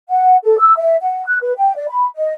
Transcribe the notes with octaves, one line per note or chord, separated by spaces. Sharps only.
F#5
A4
E6
E5
F#5
F#6
B4
G5
D5
B5
D#5